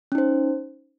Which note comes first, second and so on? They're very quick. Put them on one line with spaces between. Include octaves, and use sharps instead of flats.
C#4 D#4 C5